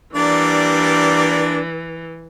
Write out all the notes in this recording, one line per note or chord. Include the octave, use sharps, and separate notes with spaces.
E3 G3 A#3 D4 D5